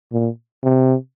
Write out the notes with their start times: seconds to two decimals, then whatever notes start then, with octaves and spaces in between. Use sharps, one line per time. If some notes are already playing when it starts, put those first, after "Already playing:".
0.13 A#2
0.64 C3